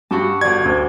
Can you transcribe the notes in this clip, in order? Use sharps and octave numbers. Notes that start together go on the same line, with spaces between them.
G2 F#4 G4 A5
G1 D5 G#6
D2